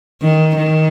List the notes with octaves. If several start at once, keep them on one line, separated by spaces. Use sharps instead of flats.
D#3
D#3